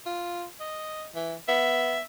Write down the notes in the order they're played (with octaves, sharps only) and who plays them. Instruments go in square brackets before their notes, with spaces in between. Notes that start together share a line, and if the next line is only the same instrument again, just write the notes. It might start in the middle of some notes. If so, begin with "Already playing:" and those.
[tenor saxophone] F4
D#5
E3
[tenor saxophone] B3 [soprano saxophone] E5